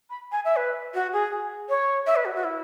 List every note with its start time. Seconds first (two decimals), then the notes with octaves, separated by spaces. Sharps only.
0.10 B5
0.32 G#5
0.45 E5
0.56 B4
0.94 F#4
1.13 G#4
1.69 C#5
2.07 E5
2.16 B4
2.25 F#4
2.35 F#4
2.44 E4